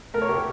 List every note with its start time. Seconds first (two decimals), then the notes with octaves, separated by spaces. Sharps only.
0.14 A3 A#4
0.22 C#5
0.28 G4 A#4